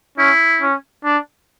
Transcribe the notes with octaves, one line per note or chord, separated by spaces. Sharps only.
C#4 E4
C#4
D4